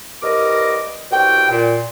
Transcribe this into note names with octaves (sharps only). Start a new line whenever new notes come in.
C2 G2 A#4 D#5 D6
C2 B2 G5
A#2